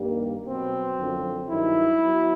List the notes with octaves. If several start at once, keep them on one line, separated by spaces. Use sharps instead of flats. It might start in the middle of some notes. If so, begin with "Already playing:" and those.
Already playing: G2 D#3 G3 A#3
B2 F#3 B3 C4
F#2 D3 F3
G2 D#3 F#3 E4
F#3 B3